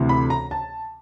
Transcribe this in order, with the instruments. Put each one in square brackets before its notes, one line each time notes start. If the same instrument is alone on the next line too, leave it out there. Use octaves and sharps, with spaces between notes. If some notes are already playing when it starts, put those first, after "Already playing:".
Already playing: [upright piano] D2 C3 E3
B5
A#5
A5